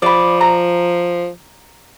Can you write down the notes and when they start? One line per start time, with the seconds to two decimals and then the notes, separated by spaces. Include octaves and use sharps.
0.02 F3 D5 B5
0.41 A#5